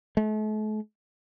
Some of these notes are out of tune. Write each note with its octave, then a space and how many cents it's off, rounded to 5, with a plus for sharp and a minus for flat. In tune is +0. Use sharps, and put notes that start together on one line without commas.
A3 -40